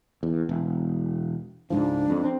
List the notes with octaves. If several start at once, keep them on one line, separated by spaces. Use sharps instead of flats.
E2
E1
C#2 G#2 F3 D4
F2
C4